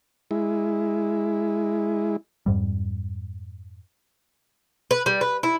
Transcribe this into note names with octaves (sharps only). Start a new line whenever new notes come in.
G#3 E4
F2 G#2 G3
B4
G3
B4
E4